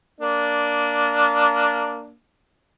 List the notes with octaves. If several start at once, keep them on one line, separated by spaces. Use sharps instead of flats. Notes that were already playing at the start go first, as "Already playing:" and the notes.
A#3 D4